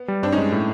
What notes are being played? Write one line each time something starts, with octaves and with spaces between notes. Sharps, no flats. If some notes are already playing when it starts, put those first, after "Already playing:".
Already playing: B3
G3
G2 C4 D4
C#4 D#4
G#3
A2